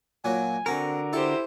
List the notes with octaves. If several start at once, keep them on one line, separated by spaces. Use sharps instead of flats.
A#2 F#3 G#5
D3 C4 F#4 A#4
E4 G4 A4 C5